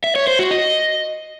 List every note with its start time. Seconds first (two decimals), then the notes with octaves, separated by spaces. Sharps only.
0.04 E5
0.16 C#5
0.27 C5
0.39 F#4
0.51 D#5